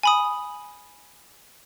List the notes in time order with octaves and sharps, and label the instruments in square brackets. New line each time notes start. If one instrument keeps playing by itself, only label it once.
[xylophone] G#5 B5 D#6